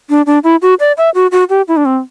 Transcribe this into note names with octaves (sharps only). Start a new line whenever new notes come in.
D4
D4
E4
F#4
D5
E5
F#4
F#4
G4
E4
D4
C4